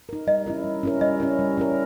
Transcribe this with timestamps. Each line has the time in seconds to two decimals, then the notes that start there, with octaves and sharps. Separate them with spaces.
0.09 D#4 A#4
0.27 G3 D#5
0.46 C#4 E4 A#4
0.64 G3
0.83 C#4 E4 A#4
1.01 G3 D#5
1.20 C#4 E4 A#4
1.39 G3
1.58 C#4 E4 A#4